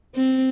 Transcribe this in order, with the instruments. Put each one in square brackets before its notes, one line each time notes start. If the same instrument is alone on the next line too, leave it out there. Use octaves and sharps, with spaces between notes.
[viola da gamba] C4